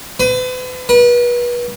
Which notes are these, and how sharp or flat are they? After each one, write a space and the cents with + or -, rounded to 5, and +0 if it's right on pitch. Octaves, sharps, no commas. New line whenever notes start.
B4 +40
B4 -35